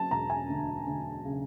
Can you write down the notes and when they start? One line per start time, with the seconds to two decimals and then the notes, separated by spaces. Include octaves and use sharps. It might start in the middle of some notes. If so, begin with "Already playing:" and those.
Already playing: F#3 A5
0.11 E1 A#5
0.30 G#5
0.49 D2
0.87 D2
1.25 C#3